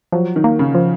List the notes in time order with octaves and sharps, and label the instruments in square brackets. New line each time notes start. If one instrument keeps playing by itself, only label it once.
[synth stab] F3 [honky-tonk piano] F#3
[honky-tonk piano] D#3
[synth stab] A#3
[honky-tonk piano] C#3
[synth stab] F3